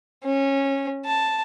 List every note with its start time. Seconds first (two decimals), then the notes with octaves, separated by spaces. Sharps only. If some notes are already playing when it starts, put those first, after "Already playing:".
0.24 C#4
1.05 A5